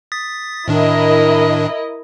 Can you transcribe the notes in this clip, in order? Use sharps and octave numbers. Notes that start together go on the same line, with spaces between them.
D#6 A6 B6
A2 D#3 D4 E4 A#4 D#5